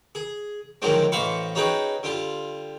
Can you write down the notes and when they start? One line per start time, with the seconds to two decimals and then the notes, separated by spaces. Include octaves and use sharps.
0.15 G#4
0.82 D3 D#3 F3 F#3 G#3 C4
1.12 A1 B2 C5 F5 B5 C#6
1.55 C#4 D#4 F#4 G#4 B4 G5
2.03 D3 G3 F4